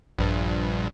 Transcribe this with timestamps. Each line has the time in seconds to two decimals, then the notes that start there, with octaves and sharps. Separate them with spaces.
0.18 A#1 G2